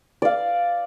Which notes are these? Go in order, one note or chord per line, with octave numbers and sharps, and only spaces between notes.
D5 F5